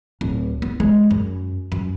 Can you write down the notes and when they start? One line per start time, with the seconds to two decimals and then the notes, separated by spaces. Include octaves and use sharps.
0.21 D1
0.62 B3
0.80 G#3
1.11 F#2
1.72 F#2